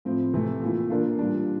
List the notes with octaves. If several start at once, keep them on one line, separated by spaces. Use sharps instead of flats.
A2 F3 C4
C3 E3 A3
A#2 A3 E4
E3 A#3 D4 F4
A#2 G3 D4